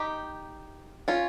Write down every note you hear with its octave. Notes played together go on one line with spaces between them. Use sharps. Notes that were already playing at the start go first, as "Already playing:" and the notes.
Already playing: D#4 G4
C#4 F4